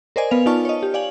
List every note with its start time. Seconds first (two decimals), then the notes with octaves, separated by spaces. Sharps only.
0.16 A#4 C5 D5 D#5 G#5
0.31 B3 B4 F5 F7
0.46 D#4 F4 D5 A5 C#6 F6
0.65 C#5 D#5
0.83 G4
0.94 D5 F5 G#5 F#7